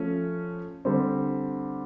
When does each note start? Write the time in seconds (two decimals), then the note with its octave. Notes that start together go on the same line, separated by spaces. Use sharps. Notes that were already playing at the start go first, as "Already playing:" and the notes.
Already playing: F3 A3 C#4
0.85 D3 G3 C4